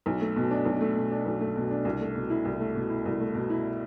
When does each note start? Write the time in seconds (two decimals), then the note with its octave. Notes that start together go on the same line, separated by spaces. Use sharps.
0.06 B1
0.21 A3
0.36 B2
0.51 D4
0.65 B1
0.81 A3
0.96 B2
1.11 D4
1.26 B1
1.41 A3
1.56 B2
1.70 D4
1.85 C2
2.00 A3
2.15 B2
2.30 E4
2.45 C2
2.60 A3
2.75 B2
2.89 E4
3.05 C2
3.20 A3
3.35 B2
3.50 E4